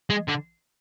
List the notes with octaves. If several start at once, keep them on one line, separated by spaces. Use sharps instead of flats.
G#3
D3